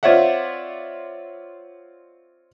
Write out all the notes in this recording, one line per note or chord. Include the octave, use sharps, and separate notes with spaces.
C4 F4 C#5 D5 E5 F#5